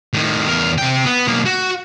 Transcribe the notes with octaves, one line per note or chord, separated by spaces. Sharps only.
A2 D#3
E2 A#4
C3 G5
B3
B1 A#3
F#4